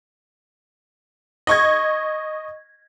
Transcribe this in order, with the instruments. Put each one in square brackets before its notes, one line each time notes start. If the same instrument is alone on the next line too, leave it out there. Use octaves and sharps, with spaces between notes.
[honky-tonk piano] D#5 C#6 G#6